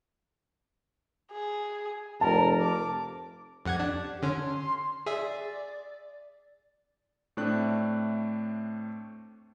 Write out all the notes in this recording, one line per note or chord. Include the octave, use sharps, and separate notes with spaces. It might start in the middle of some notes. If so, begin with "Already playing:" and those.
G#4
F1 A#4 A5
D6
F2 G4 F#5 G#6
D4
D3 C#4 C6
G#4 D5 E5
A2 A3 C4 D4 F#6